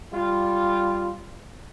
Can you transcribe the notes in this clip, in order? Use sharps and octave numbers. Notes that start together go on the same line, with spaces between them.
G3 F4